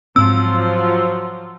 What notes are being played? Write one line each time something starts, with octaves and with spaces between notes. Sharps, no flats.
G#2 F3 F#3 C4 F4 E6